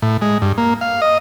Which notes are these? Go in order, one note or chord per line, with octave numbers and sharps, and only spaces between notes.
A2
G#3
G2
A#3
F5
D#5